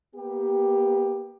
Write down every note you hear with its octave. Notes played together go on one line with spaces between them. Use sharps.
A#3 B3 G4